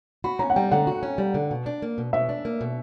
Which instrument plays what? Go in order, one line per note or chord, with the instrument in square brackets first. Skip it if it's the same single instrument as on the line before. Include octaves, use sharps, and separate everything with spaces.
[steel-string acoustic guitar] F#4 [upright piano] B5
[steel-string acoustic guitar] C#4 [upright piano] A#5
[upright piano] F#5
[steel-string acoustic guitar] G3 [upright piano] G5
[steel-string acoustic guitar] D3 [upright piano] F#5
[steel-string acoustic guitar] F#4
C#4
G3
D3
B2
D4
A#3
B2
[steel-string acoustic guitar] B2 [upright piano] E5
[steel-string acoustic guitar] D4
A#3
B2